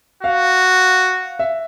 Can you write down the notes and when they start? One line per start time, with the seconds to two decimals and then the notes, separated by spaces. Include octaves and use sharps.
0.23 F#4 F5
1.39 E5